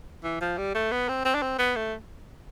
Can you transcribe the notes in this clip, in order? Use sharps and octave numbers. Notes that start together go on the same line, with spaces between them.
E3
F3
G3
A3
B3
C4
C4
D4
C4
B3
A3